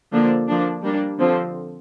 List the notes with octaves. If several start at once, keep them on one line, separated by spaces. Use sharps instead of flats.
D3 F3 A#3 D4
F3 A#3 D4
G3 A#3 D4
D3 F3 C4